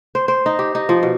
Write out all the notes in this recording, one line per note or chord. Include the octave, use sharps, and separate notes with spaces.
C5
C5
D#4
G4
D#4
F3
B2